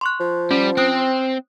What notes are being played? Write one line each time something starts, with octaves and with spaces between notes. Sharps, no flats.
C6 C#6 F#6
F3
G3 C#4
C4 D#6 F#6 D7